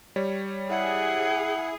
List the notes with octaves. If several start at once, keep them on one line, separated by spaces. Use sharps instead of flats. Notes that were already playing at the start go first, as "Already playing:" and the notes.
G3 C#5
E4 G#4 F#5